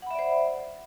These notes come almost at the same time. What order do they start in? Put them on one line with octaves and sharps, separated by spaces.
F#5 B5 E5 D5 C5